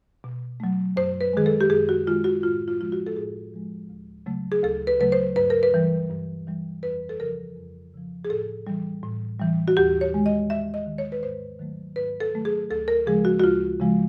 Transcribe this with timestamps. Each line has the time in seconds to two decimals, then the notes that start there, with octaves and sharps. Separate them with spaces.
0.24 B2
0.60 F#3 A3
0.96 F#2 C5
1.21 B4
1.33 D#3 G#3 G#4
1.46 A4
1.61 G4
1.70 F#2 G#4
1.89 F#4
2.07 D#3 G#3 F4
2.24 F#4
2.43 A2 F4
2.68 F4
2.79 F3 G#3 F4
2.92 F#4
3.07 A4
3.16 A2 G#4
3.54 F3 G#3
3.89 D2
4.26 C#3 F#3 A3
4.52 G#4
4.63 D2 A4
4.87 B4
5.00 C#3 F#3 A3 B4
5.12 C5
5.36 G2 B4
5.50 A#4
5.63 B4
5.74 E3 G3
6.10 G2
6.47 E3 G3
6.83 F2 B4
7.09 A4
7.20 C#3 F3 A#4
7.56 F2
7.94 C#3 F3
8.25 G#4
8.29 A2 A4
8.67 E3 G3
9.03 A2
9.39 E3 G3
9.68 F#4
9.77 D#2 G4
10.01 C#5
10.14 D#3 G#3
10.26 D#5
10.49 D#2 E5
10.74 D#5
10.86 D#3 G#3
10.98 C#5
11.12 B4
11.23 G#2 C5
11.59 D#3 F#3 A3
11.96 G#2 B4
12.20 A4
12.33 D#3 F#3 A3
12.45 G#4
12.70 D2 A4
12.88 A#4
13.06 C#3 F3 G#3 G#4
13.25 F#4
13.39 F#4
13.43 D2 F4
13.80 C#3 F3 G#3